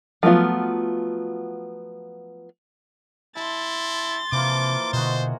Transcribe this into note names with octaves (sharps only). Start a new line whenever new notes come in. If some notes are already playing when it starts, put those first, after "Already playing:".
F3 F#3 A3 B3 F4
E4 A5 C6 A6
C3 E3 F3 A#3 D6
B2 D3 F#4 G#4 C5 D#5